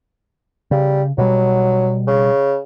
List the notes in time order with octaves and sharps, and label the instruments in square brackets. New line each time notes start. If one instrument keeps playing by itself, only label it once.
[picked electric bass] C#3 [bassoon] G3
[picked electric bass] B2 G3 [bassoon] F#3
[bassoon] C#3